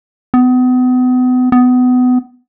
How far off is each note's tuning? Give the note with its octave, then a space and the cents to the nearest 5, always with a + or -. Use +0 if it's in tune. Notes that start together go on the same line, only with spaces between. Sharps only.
B3 +35
B3 +25